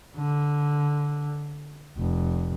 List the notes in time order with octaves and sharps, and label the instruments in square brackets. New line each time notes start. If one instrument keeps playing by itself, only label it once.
[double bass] D3
F1